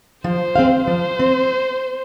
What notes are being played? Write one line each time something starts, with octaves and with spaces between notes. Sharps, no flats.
F3 C5
C4 G#4 F5
F3 C5
C4